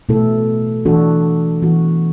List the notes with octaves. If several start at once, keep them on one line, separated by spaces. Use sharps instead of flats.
B2 A3 E4 A4
E3 D4 F#4 A4
E3 B3 F#4